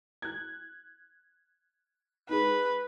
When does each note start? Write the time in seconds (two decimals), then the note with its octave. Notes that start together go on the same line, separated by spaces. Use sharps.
0.22 F#6 G#6
2.29 G#3 D#4 B4